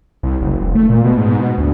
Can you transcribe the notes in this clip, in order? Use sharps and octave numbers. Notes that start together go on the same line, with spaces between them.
C2
F#1
E1
A3
A#2
B2
G#2
B2
D2